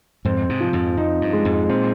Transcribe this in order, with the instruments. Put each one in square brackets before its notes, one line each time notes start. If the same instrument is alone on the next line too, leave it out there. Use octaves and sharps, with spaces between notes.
[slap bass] F2 G#2 [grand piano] C4
[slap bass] G#2 C3
[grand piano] F3
[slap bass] F2 G#2
[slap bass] F2 [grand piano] D#4
[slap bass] G2
[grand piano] G#3
[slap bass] F2 G#2
[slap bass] A#2 [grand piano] C4